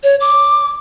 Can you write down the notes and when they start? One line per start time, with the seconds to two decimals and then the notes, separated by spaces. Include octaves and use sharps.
0.03 C#5
0.21 D6